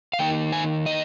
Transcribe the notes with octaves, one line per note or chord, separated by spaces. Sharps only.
F5
D#3 A#3 D#4 G5
G#5
D#5